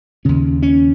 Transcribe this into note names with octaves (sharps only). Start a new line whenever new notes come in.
D#2 C#3 C#4
C#4